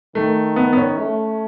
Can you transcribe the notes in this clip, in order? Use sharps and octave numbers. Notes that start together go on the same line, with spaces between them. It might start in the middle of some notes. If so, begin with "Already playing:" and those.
D#3 A3
B3
B3
C#4
A3